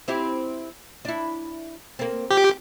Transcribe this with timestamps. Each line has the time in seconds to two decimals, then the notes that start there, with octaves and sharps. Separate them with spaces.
0.08 C4 E4 G4
1.05 D4 E4
1.99 A#3 C4
2.30 F3 G4